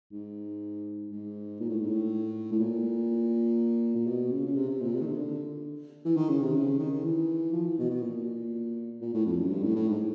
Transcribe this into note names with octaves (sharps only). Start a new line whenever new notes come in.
G#2
G#2
A#2
A2
G#2
A2
A2
A#2
A#2
B2
C#3
C#3
C3
C3
A#2
C3
D#3
D3
E3
D#3
C#3
C3
C#3
D#3
E3
F3
E3
B2
B2
A#2
A#2
A2
F2
F#2
G2
A2
A2
G#2